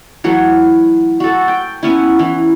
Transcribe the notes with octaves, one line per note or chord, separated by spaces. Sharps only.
E3 F#3 A3
F#4 A4
G5
B3 C#4 E4
E3